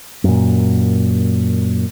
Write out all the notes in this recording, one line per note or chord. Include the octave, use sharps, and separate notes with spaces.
F#2 A#2